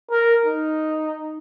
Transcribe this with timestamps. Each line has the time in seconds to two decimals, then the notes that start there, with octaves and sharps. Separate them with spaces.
0.11 A#4
0.46 D#4